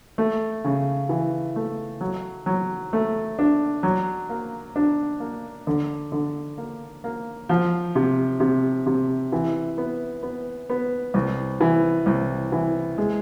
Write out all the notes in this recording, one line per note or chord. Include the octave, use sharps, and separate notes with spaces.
A3
C#3
E3
A3
F#3
F#3
A3
D4
F#3
A#3
D4
A#3
D3
D3
A#3
A#3
F3
C3
C3
C3
E3
B3
B3
B3
C2
E3
C2
E3
G#3